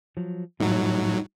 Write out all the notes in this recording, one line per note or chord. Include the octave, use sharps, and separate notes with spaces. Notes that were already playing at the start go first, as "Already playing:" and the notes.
F3 F#3
A2 F#3 G3 D#4 F4